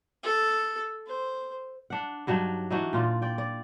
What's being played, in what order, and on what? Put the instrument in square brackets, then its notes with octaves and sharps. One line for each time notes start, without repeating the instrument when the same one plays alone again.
[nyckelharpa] A4
C5
[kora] D4 F#5
G2 F#3 D4 D#4
E3 D4 D#4 F#4
A#2 F4 D5
D5 G5
D5